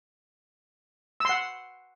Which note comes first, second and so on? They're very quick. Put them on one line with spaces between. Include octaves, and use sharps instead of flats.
E6 C6 F#5